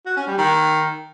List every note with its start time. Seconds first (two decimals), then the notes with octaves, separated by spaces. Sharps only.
0.06 F#4
0.17 C#4
0.27 G3
0.38 D#3